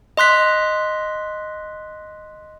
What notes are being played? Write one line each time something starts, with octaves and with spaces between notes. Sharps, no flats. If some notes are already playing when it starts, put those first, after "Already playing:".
D#5 C6 F#6 B6